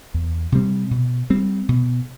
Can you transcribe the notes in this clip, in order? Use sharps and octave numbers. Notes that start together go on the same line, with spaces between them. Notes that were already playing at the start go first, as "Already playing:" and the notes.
E2
C3 G3 C4
B2
G3 C4
B2